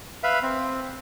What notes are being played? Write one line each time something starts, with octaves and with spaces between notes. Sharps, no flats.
B4 E5 F5
C4